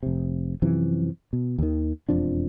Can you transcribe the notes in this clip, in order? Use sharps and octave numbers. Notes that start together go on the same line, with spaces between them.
F1 C3
F#2 C3 E3 F3
B2
D#2 D#3
E1 F2 F3 D4